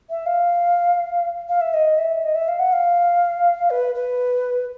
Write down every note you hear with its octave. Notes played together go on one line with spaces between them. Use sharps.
E5
F5
F5
E5
D#5
E5
D#5
E5
F5
F#5
F5
B4
B4